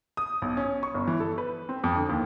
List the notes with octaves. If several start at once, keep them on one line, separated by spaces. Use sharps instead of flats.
D#6
B1
C#4
C#6
G1
E3
A4
B4
C4
F2
D3
D#2